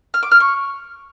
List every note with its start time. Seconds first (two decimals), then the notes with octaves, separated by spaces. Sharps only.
0.14 F6
0.23 D6
0.31 F6
0.40 C#6